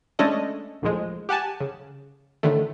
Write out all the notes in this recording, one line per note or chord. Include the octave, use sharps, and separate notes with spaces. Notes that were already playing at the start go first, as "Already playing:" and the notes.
G#3 A3 C#4 D4 A4 D#5
A#1 D#2 A2 F3 G#3
G4 F#5 G#5 A5
C#3
A2 D3 D#3 A3